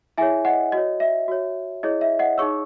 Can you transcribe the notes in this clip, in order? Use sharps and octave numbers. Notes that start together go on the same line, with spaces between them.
E4 G#4 C#5 E5 G#5
D#5 F#5
F#4 C#5 D#5
E5
F#4 C#5
E4 G#4 C#5 D#5
E5
D#5 F#5
D#4 G#4 C#5 C#6 E6